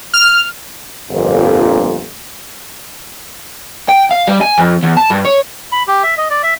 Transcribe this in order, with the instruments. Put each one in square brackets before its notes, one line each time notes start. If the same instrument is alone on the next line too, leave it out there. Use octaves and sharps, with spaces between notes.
[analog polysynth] F6
[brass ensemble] G1 F2 A#2
[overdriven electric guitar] G5
F5
G3
G#5
F2
E2
A5
G2
C#5
[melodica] B5
G4
E5
D#5
D5
E5